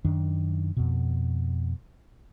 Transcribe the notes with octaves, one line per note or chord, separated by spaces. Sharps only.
F#2 D#3 D4
F2 B2